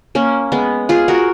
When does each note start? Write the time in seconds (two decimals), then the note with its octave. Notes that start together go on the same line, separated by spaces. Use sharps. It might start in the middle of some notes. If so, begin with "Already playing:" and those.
0.15 A#3 C#4
0.52 G#3 B3
0.89 F4 G#4
1.08 F#4 A#4